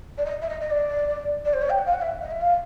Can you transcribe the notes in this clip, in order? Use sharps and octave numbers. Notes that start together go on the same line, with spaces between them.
D5
D#5
E5
D#5
D#5
D5
D5
C5
C#5
G5
F#5
F5
F#5
E5
D#5
E5
F5